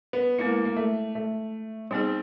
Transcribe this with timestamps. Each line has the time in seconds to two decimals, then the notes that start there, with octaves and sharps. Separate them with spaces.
0.13 B3
0.39 G#3 A#3 B3 E4
0.65 A#3
0.76 A3
1.15 A3
1.91 G3 B3 C4 D#4 G#4